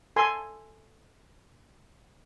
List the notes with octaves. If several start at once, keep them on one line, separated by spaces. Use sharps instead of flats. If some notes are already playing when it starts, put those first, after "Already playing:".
A4 G#5 C6